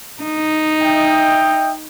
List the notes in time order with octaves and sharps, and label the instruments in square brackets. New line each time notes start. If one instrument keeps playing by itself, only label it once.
[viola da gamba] D#4
[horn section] D#5 E5 G5